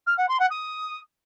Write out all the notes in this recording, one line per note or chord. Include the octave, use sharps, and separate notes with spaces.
F6
F#5
C6
F#5
D#6